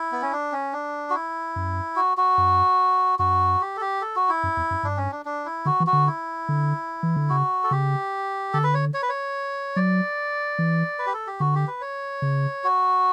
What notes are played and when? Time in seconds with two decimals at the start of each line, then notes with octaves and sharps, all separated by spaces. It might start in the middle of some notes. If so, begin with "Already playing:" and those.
Already playing: E4
0.12 B3
0.22 C#4
0.32 D4
0.52 C#4
0.73 D4
1.10 F#4
1.14 E4
1.56 F#2
1.96 F#4
2.17 F#4
2.38 F#2
3.19 F#2 F#4
3.61 G4
3.77 A4
3.81 G4
4.01 A4
4.16 F#4
4.29 E4
4.43 F#2
4.57 E2
4.71 F#2
4.83 G2 D4
4.97 C#4
5.12 D4
5.25 D4
5.45 E4
5.65 D3 F#4
5.80 E3
5.87 F#4
5.93 D3
6.07 E4
6.49 D3
7.03 E3
7.16 D3
7.29 C#3 F#4
7.64 A4
7.71 C#3 G4
8.53 D3 A4
8.64 B4
8.74 C#5
8.94 C#5
9.03 B4
9.09 C#5
9.76 F#3 D5
10.59 E3
10.99 B4
11.07 G4
11.14 A4
11.27 G4
11.40 D3 F#4
11.55 G4
11.68 B4
11.81 C#5
12.22 C#3
12.64 F#4